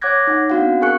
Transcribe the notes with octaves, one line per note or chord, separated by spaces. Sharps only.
C#5 F#5 D6 F#6 G#6 A#6
D#4 F#5
B3 C4 D4 F#4 F5 F#5
G#4 A#4 G#5 C#6 F#6 C#7